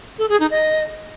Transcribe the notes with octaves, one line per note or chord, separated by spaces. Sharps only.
A4
G#4
D#4
D#5